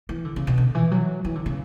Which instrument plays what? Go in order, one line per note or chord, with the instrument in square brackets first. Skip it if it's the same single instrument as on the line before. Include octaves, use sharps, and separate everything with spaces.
[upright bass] E3
D3
C#3
B2
D3
E3
F#3
E3
D3
C#3